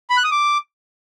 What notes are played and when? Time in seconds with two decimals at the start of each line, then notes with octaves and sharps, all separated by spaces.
0.10 B5
0.17 F#6
0.24 D#6
0.31 D6